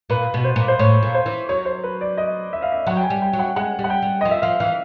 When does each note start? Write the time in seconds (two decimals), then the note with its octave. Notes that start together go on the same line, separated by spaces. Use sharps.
0.10 A#2 B4
0.34 B2
0.44 C5
0.56 A#2
0.68 C5
0.79 A2 C#5
1.03 A#2
1.14 C5
1.26 E3
1.49 F#3 C#5
1.65 C5
1.83 B4
2.01 D5
2.17 D#5
2.53 E5
2.62 F5
2.72 E5
2.87 F#3 F#5
2.97 G5
3.04 G#5
3.10 G3
3.22 G5
3.33 F#3
3.39 F#5
3.56 G#3 F#5
3.79 G3
3.84 F#5
3.90 G5
4.02 G3
4.21 F3 D#5
4.31 E5
4.42 F3 F5
4.60 E3 F5